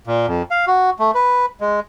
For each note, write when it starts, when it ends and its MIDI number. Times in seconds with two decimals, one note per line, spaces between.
0.07 0.26 46
0.27 0.42 41
0.51 0.65 77
0.67 0.90 66
0.99 1.11 57
1.15 1.46 71
1.61 1.80 56